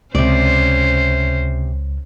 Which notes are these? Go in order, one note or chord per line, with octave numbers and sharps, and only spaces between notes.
C#2 C3 C#4 C5 D5